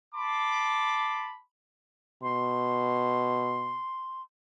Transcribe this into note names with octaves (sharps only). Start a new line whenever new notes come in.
A5 B5 C6 D6
B2 C6